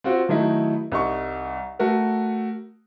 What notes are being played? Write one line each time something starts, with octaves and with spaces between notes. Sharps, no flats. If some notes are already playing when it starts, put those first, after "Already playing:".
C4 F4 F#4
D#3 F#3 A3 D#4 E4
C2 D#4 C#6
A3 F#4 A#4